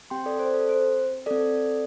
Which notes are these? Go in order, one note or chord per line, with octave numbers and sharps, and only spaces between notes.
C4 G4 G5 C6
A4 D5
C5
A4
C5
C4 A4 D5